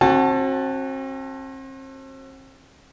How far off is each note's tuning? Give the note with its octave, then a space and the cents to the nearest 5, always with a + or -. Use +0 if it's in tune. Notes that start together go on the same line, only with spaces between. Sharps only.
C4 +40 F#4 +0 A5 +0